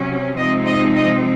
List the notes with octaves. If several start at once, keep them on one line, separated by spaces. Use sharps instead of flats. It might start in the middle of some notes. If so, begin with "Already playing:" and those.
Already playing: C3 F#3 C#4
C3 F3 G#3 C4 D#4 D#5
D#5
D#5